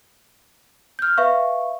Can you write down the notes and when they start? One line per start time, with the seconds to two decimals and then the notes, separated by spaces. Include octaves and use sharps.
0.99 F6 G6
1.17 B4 E5 F5 C#6